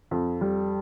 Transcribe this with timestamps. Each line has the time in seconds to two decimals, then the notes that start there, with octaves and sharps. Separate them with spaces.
0.11 F2
0.41 G3